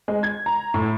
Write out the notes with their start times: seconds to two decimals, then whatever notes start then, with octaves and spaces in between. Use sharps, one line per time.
0.08 G#3
0.23 G#6
0.46 A#5
0.74 A2